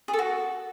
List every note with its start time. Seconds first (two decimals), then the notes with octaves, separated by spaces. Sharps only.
0.08 G#4
0.13 A4
0.19 F#4